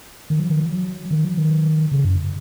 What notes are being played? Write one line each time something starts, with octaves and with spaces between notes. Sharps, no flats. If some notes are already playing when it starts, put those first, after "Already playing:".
D#3
F#3
D#3
F#3
D#3
F#3
D#3
C#3
F#2